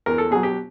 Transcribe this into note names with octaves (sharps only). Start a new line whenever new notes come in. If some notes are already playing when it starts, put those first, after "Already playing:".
E2 A#4
A4
B2 F#3 G#4
G4